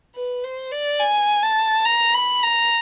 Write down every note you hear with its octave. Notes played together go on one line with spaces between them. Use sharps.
B4
C5
D5
G#5
A5
A#5
B5
A#5